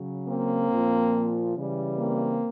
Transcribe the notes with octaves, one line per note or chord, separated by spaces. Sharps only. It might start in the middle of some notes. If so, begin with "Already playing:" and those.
Already playing: C#3 F#3
A#3 C4
A#2 F3
C#3 E3 G3
A#3 C4